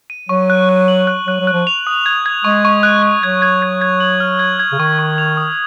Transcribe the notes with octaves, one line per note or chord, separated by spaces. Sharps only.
D#7
F#3 C#6
F#6
F#6
F#7
F#6
F#3 F#6
F#3
F#6
F3
F7
D#6
G#6
G#6
G#3 C#6
C#6
F#6
F#6
F#3 G#6
G#6
G#6
G#6
F#7
F6
G#6
G#6
C#3
D#3 C#6
C#6
F7
D#6